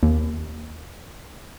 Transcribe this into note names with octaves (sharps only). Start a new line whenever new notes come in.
D#2